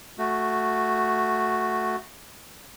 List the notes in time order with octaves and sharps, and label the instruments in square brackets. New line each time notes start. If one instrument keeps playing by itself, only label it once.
[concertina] A3 F#4